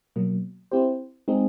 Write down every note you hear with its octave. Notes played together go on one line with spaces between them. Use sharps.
B2 F#3 A#3
C4 E4 G4 C5
G#3 C4 D#4 G#4